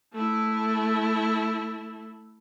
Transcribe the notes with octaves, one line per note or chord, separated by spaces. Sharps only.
A3 E4